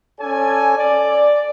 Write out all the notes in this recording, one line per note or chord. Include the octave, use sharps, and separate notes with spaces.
C#4 A4 D5 G#5
D5